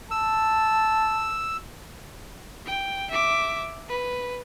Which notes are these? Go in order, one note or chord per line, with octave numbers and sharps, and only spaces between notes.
A5 E6
G5
E5 D6
B4